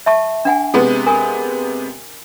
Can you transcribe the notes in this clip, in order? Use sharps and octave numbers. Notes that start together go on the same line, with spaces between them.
E5 A5 C#6
D4 F#5 G#5
C3 G#3 B3
A#4 G#5